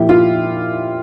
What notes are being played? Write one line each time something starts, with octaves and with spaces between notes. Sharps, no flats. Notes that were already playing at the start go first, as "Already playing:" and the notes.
Already playing: A#2 F3 E4 G4
F4